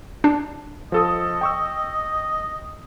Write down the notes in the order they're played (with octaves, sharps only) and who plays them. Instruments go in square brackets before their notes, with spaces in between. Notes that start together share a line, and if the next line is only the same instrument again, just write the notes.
[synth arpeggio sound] D4
[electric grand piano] F3 A4 D#6 [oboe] D#5
[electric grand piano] G5 C#6 E6